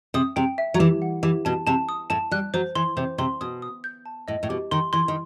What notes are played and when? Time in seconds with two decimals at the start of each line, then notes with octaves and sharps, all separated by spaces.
0.14 C3 D#6
0.36 C3 G5
0.58 E5
0.74 F#3
0.80 E3 G4
1.02 F#5
1.23 E3 G4
1.45 B2 A5
1.67 C3 A5
1.89 D#6
2.10 A2 A5
2.31 G3 F#6
2.54 F#3 C5
2.75 E3 C6
2.97 C3 C5
3.18 C3 C6
3.41 B2 D#6
3.62 D#6
3.84 G6
4.06 A5
4.28 A2 D#5
4.43 A2
4.49 B2 G4
4.71 D#3 C6
4.93 E3 C6
5.08 D#3